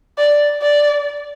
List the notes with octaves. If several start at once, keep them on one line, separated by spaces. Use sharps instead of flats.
D5
D5